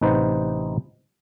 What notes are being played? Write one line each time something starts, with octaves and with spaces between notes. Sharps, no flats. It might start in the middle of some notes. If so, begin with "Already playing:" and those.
A1 C3 D#4 B4 C5 F#5